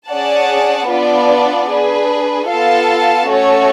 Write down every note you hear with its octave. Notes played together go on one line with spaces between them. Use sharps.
C#4 G#4 D5 F#5 A5
B3 D4 F4 B4 D5
D4 G#4 B4
B3 F4 A4 F5 A5
A3 C#4 F#4 A4 C#5